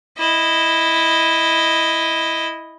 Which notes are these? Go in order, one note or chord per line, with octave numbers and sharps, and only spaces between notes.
E4 D#5